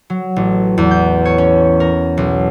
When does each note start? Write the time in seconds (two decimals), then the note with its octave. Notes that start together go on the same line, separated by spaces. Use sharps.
0.10 F#3
0.36 A1
0.78 E2
0.91 G6
1.25 C#5
1.38 C#4
1.80 A#4
2.17 B1